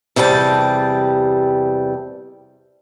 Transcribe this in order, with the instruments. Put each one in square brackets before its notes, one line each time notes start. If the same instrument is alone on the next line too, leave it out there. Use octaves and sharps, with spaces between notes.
[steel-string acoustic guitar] E2 C3 G3 B4 A5